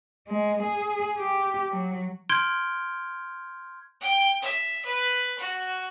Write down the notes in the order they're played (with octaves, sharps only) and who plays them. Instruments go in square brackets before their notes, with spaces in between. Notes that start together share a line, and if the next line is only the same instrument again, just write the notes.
[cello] G#3
G#4
G4
F#3
[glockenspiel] C6 F6 G6 G#6 D7 G7
[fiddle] G5
E5
B4
F#4